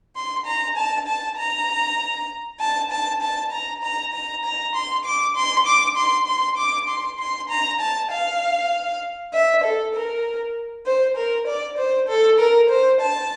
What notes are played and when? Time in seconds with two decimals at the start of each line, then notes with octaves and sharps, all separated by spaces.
0.15 C6
0.45 A#5
0.76 A5
1.07 A5
1.38 A#5
2.60 A5
2.90 A5
3.21 A5
3.51 A#5
3.83 A#5
4.13 A#5
4.44 A#5
4.75 C6
5.05 D6
5.36 C6
5.66 D6
5.96 C6
6.27 C6
6.57 D6
6.88 C6
7.19 C6
7.49 A#5
7.80 A5
8.11 F5
9.33 E5
9.63 A4
9.94 A#4
10.85 C5
11.16 A#4
11.47 D5
11.77 C5
12.08 A4
12.39 A#4
12.69 C5
13.00 A5